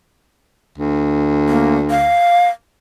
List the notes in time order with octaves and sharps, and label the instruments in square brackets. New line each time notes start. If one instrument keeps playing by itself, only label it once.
[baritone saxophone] D2
[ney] A#3
F5